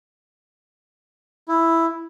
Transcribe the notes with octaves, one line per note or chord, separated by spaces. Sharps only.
E4